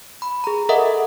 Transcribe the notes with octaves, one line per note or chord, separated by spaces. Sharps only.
B5
G#4 A#5
A4 A#4 D#5 E5 F#5